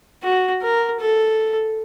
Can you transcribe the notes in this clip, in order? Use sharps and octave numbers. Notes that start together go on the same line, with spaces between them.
F#4
A#4
A4